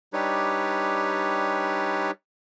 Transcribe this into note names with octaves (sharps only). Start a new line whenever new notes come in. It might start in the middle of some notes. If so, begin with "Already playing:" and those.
G3 D4 D#4 G4 B4 C#5